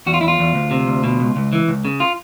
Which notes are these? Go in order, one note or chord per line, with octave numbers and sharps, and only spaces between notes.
E2 F#4
F4
E2 E4
F4
E2
D2
C3
D2
B2
C#2
C#2
E3
C#2
C#3
F4